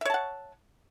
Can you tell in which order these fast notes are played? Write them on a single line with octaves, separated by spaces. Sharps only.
E5 C#5 A5 F#5